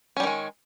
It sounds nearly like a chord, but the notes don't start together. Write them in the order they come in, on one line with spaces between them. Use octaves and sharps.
C#4 G3 D#3 G#3